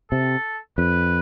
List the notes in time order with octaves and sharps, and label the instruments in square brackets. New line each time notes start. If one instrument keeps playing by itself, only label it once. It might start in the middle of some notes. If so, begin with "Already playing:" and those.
[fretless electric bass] C3 [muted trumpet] A4
[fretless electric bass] F2 [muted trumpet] B4